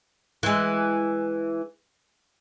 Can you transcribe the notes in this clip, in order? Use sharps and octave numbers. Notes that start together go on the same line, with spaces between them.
E3 G#3